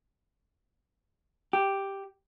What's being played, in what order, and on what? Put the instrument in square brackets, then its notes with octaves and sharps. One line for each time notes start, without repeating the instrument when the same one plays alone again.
[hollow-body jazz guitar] G4